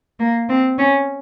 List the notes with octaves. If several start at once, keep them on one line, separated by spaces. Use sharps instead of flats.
A#3
C4
C#4